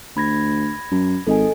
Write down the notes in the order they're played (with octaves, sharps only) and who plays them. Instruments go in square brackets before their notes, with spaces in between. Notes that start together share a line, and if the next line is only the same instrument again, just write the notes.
[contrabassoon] D2 [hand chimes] B5 G#6 A#6
[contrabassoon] F#2
[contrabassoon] G#1 [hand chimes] A4 D#5 G#5